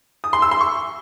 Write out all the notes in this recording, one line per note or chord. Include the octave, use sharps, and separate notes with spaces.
D#6
C6
E6
C6
C#6